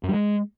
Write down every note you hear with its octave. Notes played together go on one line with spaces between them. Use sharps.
F#2
G3
G#3